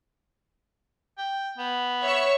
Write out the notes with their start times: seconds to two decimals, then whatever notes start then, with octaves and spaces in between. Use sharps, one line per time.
1.18 G5
1.58 B3
2.02 C#5 E5 C#6